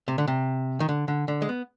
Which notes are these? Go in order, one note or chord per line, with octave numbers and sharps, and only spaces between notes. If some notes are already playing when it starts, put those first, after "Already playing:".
C3
D3
C3
D#3
D3
D3
D3
G#3
B3